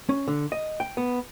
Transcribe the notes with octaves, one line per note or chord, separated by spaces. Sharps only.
C#4
D3
D#5
G5
B3